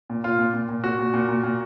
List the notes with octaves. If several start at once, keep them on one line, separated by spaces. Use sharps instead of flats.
A#2
A#2 F4
A#2
A#2
A#2
A#2 F#4
A#2
A#2
A#2
A#2